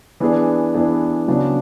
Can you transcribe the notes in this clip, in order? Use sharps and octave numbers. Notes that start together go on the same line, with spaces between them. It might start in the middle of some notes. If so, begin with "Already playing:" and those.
E3 B3 D4 G#4
E3 B3 D4 G#4
C#3 F#3 B3 D4 F#4